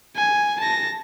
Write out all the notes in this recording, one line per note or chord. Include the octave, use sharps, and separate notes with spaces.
G#5
A5 A#6